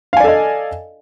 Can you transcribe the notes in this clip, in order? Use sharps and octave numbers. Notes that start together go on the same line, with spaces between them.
A4 D5 D#5 F5 G#5